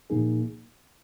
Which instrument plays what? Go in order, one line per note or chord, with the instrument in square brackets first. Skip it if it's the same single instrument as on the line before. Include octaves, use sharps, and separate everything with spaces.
[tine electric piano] A#2 F3 A#3 D#4 G#4